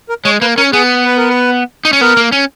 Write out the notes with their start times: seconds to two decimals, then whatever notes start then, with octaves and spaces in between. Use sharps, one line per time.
0.09 A#4
0.25 G#3 C#5
0.41 A#3 B4
0.57 C#4 A#4
0.73 B3 G#4
1.05 B4
1.17 A#4
1.29 B4
1.85 D#4
1.93 C#4
2.01 B3 A#4
2.17 A#3
2.32 C#4